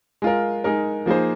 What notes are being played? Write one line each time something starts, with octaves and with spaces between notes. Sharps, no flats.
G#3 F4 A#4
G#3 D#4 A#4
F3 A#3 D#4 G#4 C5